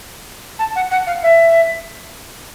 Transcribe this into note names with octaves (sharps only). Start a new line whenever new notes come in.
A5
F#5
F#5
F5
E5